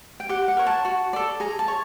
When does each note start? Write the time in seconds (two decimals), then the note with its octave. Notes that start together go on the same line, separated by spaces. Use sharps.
0.20 G5
0.29 G4 F#5
0.48 F#5
0.57 A#4 C#5
0.66 A5
0.85 F#4
1.13 A4 D5
1.40 G#4 A#5
1.59 A5
1.68 C#5